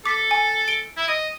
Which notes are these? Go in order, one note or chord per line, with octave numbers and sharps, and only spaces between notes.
A4 D6 B6
G#5
D7 G7
E4
D#5 D#7